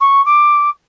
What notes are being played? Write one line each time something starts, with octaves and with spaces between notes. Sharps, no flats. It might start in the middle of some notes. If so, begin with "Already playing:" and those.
C#6
D6